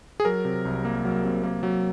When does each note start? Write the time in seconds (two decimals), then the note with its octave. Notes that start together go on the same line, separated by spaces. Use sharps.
0.20 G#4
0.25 F#3 A#4
0.45 C3
0.65 C2
0.85 A#3
1.05 F#3
1.24 C3
1.43 A#3
1.63 F#3